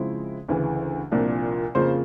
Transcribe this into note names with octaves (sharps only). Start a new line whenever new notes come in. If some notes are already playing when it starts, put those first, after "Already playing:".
Already playing: C#3 F3 G#3 C4 E4
D2 C#3 E3
C2 A#2 F3 A#3 D4
F2 C#3 F3 A#3 C5